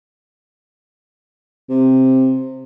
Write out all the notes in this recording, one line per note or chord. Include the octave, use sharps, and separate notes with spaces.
C3